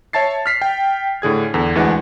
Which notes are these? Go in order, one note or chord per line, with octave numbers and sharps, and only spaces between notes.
C#5 E5 A5 A6 C7
F6 B6 C7
G5
A2 D3 G#4 G#6
E2 D3
D2 E3 G#3 D4 F#5 G#5